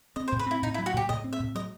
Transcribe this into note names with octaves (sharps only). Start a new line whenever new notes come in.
C4 D#5
C5
A2
B4
C4 E4
A2 D#4
E4
F#3
F#4
A2 G4
A2 D#5
C4
E5
A2
F#3 D#5